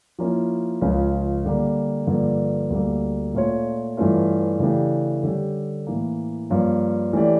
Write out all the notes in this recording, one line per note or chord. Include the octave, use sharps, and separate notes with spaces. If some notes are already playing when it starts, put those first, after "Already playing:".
F3 A#3 C#4 E4
C#2 C#3 F3 C#4
D3 G3 A#3
G2 D3 F3 A#3 D4
D2 D3 G3 A#3
A#2 A3 C#4 F4 C#5
G2 E3 A3 C#4 F4
C#3 E3 A3 D4 G4
D3 G3 C#4 G4
A2 E3 A#3
G2 F3 A#3 C#4
E3 A3 C#4 G4 D5